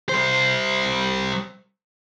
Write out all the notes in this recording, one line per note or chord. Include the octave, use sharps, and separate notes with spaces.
G3 C5